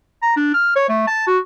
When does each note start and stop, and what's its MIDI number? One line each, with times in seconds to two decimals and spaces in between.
0.23 0.34 82
0.36 0.54 62
0.54 0.75 89
0.76 0.87 73
0.89 1.06 57
1.08 1.23 81
1.27 1.38 66